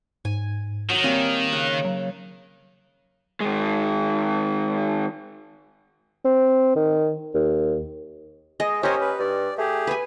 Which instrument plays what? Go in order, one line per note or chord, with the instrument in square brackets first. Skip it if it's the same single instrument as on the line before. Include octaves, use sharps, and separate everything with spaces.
[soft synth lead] G#2 [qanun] G#5
[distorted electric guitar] D#3 [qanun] F#3 F#4
[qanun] G3 A#3 G#5 [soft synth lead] C4
[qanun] C#3 [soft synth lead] F#6
[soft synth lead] F#3
[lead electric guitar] D#3 G#3
[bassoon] C4
D#3
D#2
[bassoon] G#3 [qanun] D#5
[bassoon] C#4 [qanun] G4 D#5 [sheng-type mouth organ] A#4 C5 C#5
[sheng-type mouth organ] B4
[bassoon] G2 [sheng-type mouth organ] D5
[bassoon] A3 [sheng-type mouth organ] G4 G#4
[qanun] B4 G#5